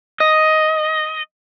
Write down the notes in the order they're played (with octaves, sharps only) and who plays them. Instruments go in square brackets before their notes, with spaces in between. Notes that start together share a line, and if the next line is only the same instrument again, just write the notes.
[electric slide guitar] D#5